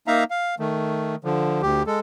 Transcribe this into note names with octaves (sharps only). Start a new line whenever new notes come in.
A#3 D#4 E5 F5 A#5
F5
D#3 A3
D3 F3
D2 G4
G#3 A4